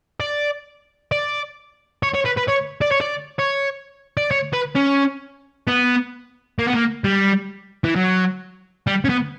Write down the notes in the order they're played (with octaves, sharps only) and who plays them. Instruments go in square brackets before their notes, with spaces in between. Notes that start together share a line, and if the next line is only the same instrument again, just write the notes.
[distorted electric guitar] D5
D5
C#5
C#5
B4
B4
C#5
D5
C#5
D5
C#5
D5
C#5
B4
C#4
B3
A#3
B3
A#3
G3
E3
F#3
G3
C#4
B3